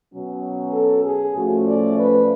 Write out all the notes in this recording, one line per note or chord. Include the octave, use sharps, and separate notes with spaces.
B2 F#3 C#4
A4
G#4
A2 F3 A3 C#4 F#4
D5
B4